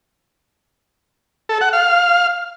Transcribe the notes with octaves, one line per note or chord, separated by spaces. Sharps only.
A4
F#5
F5